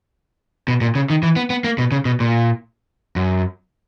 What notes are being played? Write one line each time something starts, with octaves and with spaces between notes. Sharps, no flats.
B2
A#2
C#3
D#3
E3
B3
B3
A#3
B2
C#3
B2
A#2
F#2